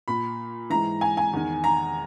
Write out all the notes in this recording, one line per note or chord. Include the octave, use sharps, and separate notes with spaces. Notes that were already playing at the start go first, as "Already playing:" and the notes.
A#2 B5
G#2 E3 A#5
G#5
G#5
E2 D#3
A#5